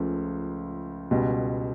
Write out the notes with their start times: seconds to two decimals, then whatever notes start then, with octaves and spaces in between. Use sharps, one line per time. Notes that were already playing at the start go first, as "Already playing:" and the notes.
Already playing: C#2 C#3 F3 A3
1.11 C#2 B2 G3